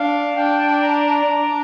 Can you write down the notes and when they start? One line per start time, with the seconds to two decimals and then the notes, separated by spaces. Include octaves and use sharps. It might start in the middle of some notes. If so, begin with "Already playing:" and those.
Already playing: D4 F5
0.36 D4 G5
0.82 A#5
1.27 D4